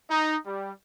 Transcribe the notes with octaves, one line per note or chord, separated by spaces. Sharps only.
D#4
G3